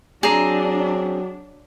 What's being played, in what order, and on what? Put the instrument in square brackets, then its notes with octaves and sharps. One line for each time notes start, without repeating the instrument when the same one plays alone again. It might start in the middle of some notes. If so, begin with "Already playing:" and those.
[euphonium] F#3 [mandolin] C4 A#5 [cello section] D4 [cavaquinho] G#4